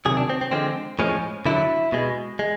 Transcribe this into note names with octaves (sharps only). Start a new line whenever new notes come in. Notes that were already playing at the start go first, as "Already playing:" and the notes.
C3 D#3 F#3 G#4
D4
C4
C4
D3 F3 G#3 C4
A2 F3 G#3 C#4
D3 F#3 E4
B2 G#3
G#3